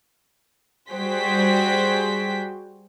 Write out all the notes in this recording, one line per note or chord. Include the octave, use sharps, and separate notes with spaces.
G3 F#4 G#4 C5 G5 B6